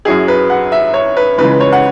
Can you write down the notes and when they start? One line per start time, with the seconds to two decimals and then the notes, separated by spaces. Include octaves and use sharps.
0.05 F#2 F#3 E4 G#4
0.28 B4
0.50 F#5
0.72 E5
0.94 C#5
1.16 B4
1.38 C#2 C#3 E3 G#3 B4
1.60 C#5
1.73 F#5